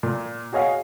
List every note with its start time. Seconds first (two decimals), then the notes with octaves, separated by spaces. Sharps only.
0.03 A#2
0.52 F#4 G#4 C#5 D#5 F5 F#5